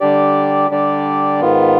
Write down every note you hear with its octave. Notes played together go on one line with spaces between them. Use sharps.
D3 G3 D4 G4 D5
D3 G3 D4 G4 D5
G#2 D#3 B3 F4